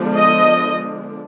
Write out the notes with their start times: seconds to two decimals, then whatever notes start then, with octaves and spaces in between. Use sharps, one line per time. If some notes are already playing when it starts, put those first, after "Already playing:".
Already playing: D3 F3 G#3 B3 D4
0.15 D#5